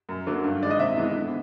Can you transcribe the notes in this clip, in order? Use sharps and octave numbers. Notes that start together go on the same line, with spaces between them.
F#2
D3 F#3 A#3
G2
D#3 G#3 D5
D#5
C3 E5
E3 G#3 B3
D3